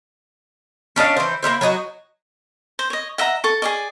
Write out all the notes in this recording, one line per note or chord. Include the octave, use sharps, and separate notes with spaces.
C#4 D4 D#5 F5
E3 C5
A#3 B3 E4 C5
F#3 D4 D#4 F#4
C5
C#5 D#5
D#5 E5 F#5 A#5
A4 C#6
G#4 D5 D#5